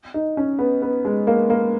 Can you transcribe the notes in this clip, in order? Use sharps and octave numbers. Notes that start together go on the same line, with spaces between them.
D#4
C#4
B3
B3
G#3
A#3
A#3